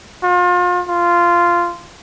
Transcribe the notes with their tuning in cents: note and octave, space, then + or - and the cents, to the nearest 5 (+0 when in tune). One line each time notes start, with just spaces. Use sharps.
F4 +35
F4 -10